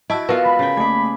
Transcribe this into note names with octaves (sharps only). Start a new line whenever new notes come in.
E4 F#4 D#5 A5 E6
B3 F4 F#4 A#4 B4 F5 B6
G#3 B5
C#3 G5 G#5 A#5 A6
A3 A#3 D6 G#6